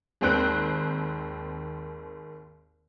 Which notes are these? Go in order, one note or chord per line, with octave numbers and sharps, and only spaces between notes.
G#1 D#2 C4 C5 F#6 D7